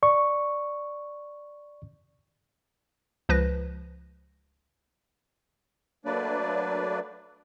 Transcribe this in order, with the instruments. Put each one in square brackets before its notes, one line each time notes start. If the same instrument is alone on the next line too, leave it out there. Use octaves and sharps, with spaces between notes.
[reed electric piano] D5 C#6
[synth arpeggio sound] C#2 F3 B4 F#6 A#6
[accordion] F#3 A3 A#3 D4 B4 D5